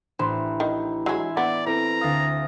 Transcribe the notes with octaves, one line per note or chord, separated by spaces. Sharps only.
A1 D4 C5 B5
D#3
F#3 G#3 E5 G#5 C6
B3 D5
C4 E4 A4 B4 A#5
D2 F5 D#6 A6 A#6